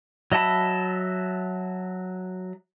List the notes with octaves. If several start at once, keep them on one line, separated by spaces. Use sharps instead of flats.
F#3 D#5 E5 A5 B5